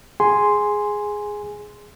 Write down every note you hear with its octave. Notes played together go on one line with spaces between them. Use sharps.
G#4 G#5 C6